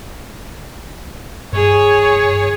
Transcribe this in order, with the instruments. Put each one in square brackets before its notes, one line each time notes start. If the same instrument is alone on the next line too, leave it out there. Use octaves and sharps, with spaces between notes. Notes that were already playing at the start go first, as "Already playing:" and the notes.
[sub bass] G2 [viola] G#4 C#5